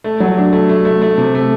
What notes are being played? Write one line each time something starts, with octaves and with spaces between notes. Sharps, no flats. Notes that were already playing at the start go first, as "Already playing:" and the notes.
A3
F#3
D4
A3
A3
A3
A3
C3
A3